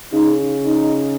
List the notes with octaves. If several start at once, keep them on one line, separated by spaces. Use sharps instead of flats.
C#3 D#4
D#4